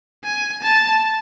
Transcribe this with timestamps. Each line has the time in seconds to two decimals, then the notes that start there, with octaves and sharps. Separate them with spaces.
0.24 G#5
0.63 A5